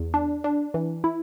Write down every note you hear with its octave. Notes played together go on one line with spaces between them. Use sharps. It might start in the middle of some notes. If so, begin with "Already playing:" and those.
Already playing: E2
D4
D4
E3
E4